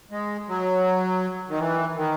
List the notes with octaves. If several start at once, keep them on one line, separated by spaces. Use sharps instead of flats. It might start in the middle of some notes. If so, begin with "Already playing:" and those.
G#3
F#3
D#3
E3
D#3